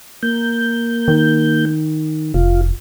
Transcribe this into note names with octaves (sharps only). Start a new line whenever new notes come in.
A#3 G6
D#3
F1 F4